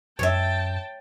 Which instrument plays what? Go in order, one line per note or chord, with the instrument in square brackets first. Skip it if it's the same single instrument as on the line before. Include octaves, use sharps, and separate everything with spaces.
[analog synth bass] F#2 [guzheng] C#5 E5 [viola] G5 A5